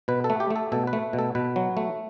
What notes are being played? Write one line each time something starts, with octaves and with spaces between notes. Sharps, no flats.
B2 B4
A4
A3
G4
A3
A4
B2 A4
B4
A3
B2
A4
B2 B4
F#3
A3